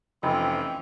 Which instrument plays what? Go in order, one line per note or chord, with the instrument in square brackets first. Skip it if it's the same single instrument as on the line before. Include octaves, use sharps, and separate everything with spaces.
[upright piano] F1 [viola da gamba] E3 F3 C#4 [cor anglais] C4 [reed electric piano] D#5 G5 B5